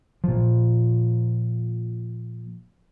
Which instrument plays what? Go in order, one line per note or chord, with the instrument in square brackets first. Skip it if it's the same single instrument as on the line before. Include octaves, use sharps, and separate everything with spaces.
[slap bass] A#2 F3